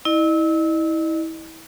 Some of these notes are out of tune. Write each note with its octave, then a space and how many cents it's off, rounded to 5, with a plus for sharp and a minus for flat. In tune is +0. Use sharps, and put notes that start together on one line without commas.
E4 -30 D#5 -40